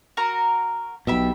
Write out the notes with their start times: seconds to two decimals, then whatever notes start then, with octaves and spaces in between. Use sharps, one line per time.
0.17 F#4 A#4 A#5
1.07 B1 B2 G4 E5 B5